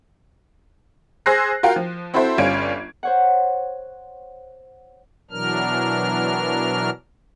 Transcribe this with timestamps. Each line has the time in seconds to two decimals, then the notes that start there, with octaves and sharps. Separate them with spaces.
1.26 G#4 C5 E6 F#6 A#6 C7
1.63 F4 F#4 A#4 F5 G5
1.76 F3
2.14 C4 E4 F#4 A4 C5 E5
2.38 G1 G3 C#4 F4 G#6 D7
3.03 C5 C#5 F#5
5.31 B2 E3 F#3 D4 A#4 F6